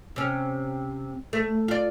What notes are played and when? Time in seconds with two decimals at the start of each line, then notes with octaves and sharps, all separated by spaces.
0.16 C3 C#4
1.33 A3
1.68 F4 D5